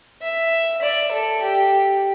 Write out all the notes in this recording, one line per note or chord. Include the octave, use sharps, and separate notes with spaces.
E5
D5
A4
G4